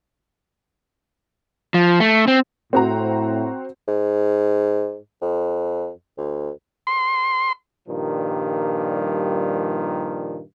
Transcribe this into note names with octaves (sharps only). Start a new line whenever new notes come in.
F3
A3
C4
A2 C4 F#4 A#5
G#2
F2
D2
C6
G2 A#2 D#3 F3 G3